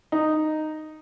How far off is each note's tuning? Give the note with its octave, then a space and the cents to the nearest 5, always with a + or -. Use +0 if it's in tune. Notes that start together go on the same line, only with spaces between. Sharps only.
D#4 -10